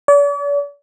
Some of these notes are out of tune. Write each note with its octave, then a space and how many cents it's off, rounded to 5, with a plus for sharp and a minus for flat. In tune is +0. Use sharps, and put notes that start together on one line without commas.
D5 -45